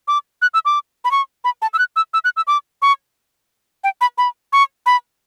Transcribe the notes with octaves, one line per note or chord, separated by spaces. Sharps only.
D6
F#6
E6
D6
B5
C#6
B5
A5
E6
F#6
E6
E6
F#6
E6
D6
C#6
G5
B5
B5
C#6
B5